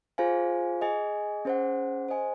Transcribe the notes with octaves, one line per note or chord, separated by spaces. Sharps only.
F4 G#4 C5 F5 G#5
G#4 D#5 G#5
C#4 G#4 C5 F#5
G#4 C5 D#5 G#5